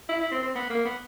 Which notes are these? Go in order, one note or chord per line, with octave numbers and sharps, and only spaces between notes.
E4
E4
C4
C4
B3
A#3
B3